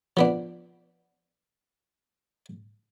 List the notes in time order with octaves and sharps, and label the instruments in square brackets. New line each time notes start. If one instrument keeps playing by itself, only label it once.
[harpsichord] F3 B3 D4